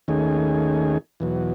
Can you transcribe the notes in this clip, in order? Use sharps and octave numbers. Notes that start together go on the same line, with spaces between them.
D#2 D#3 A3 C#4 G#4
E2 B2 F#3